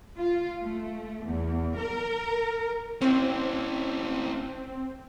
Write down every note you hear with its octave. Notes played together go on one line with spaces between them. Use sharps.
F4
A3
E2
A#4
C4 C#4 E4